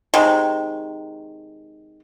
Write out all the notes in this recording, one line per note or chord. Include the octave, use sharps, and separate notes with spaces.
C3 D#3 G#3